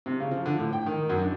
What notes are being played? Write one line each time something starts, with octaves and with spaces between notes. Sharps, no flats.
C3
C#3
F3
D3
A2
G5
D#3
F#2
D4